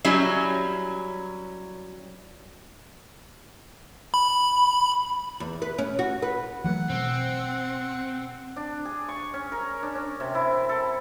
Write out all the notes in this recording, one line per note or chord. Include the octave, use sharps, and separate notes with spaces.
F#3 G3 C#4 E4
B5
E2
B4
C#4
F#4
B4
E3 F#3 A3 F#5
B2 C4
D4
G#4
C#6
C#4
A#4
D4
C#4
C3
E4
A4